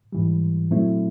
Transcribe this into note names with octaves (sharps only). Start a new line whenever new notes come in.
G#2 E3 G3
A#2 F#3 A3 C4 E4